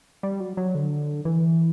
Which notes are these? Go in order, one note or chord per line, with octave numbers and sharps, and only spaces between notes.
G3
F#3
F#3
D3
E3